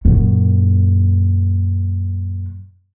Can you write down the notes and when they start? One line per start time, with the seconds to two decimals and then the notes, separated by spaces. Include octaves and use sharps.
0.05 F#2 A#2